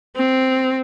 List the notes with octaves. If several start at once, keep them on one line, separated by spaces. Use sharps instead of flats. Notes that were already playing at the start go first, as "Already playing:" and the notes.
C4